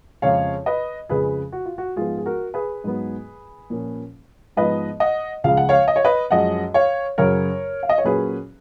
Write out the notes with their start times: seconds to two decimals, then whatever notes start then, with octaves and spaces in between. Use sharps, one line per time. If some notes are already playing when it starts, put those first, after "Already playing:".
0.22 F2 C#3 F3 G#3 C#5 F5
0.66 B4 D#5
1.09 F2 C#3 G#3 G#4 B4
1.52 F#4
1.66 F4
1.78 F#4
1.96 G#2 F3 B3 F4 G#4
2.18 G#4
2.26 F#4 A#4
2.54 G#4 B4
2.84 G#2 F#3 B3
3.70 A#2 F3 A#3 C#4
4.57 G#2 F3 B3 B4 D#5
5.00 D#5 F#5
5.44 C#2 C#3 F3 G#3 F5
5.57 F#5
5.69 C#5 F5
5.88 D#5
5.96 C#5
6.05 B4 D#5
6.31 F#2 F3 G#3 C#4 D#5 F#5
6.74 C#5 F5
7.18 F#2 C#3 F#3 A#4 C#5
7.83 F5
7.89 D#5
7.98 C#5
8.04 A#2 F#3 A#3 C#4 G#4 B4